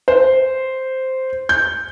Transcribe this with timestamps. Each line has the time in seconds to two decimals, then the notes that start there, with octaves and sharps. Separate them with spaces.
0.08 C5
1.49 G6